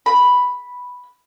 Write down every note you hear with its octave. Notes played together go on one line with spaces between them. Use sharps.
B5